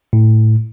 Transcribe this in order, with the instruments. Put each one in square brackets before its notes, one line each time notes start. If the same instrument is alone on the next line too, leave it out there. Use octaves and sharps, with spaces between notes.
[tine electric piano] A2